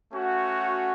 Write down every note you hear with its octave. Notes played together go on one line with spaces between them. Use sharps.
A3 C#4 F#4